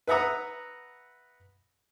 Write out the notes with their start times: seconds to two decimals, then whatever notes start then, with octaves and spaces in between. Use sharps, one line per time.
0.07 B4 E5 F#5 A#5 D#6